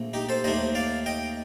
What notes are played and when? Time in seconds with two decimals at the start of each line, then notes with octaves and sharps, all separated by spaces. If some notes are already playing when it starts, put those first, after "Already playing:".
Already playing: A#1 A#2 A3
0.13 D#4 G4
0.29 A4 C5
0.44 D#2 D#3 A3 D4 C5 D#5
0.75 D5 F5
1.06 D#5 G5